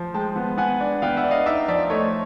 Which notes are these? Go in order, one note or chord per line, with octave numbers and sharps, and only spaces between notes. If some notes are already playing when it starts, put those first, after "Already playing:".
Already playing: F3
G#3 G5 A5
B3
B3 F#5 G#5
D4
B3 F5 G5
E5 F#5
D4
D#5 F5
D#4 D5 E5
F3 D5 E5
A3 C#5 D#5